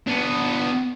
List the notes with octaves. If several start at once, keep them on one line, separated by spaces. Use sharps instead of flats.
B3 D4